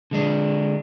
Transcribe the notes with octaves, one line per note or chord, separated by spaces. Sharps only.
D3 G#3 D4